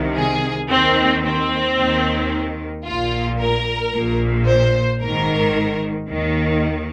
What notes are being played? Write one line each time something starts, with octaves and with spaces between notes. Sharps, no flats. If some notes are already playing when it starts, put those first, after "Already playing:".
Already playing: C2 C3 D#3
G#4
D#2 D#3 C4
C4
D#2 D#3
A#1 A#2 F4
A#4
A#1 A#2
C5
G#1 G#2 D#3 A#4
D#2 D#3